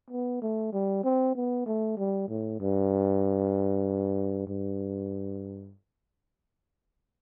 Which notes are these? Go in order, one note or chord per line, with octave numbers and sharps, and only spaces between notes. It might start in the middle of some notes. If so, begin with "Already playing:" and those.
B3
A3
G3
C4
B3
A3
G3
A2
G2
G2